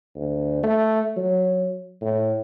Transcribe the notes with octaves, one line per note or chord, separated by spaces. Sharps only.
D2
A3
F#3
A2